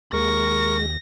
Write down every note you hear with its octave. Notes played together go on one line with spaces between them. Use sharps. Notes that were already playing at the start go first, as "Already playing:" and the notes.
D#2 G#3 A#4 C#6 A#6